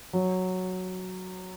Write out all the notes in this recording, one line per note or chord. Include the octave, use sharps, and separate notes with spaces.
F#3